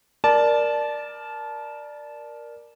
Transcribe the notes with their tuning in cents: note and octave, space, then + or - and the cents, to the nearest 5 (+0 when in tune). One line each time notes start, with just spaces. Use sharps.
A#4 +10 D5 +5 A5 -20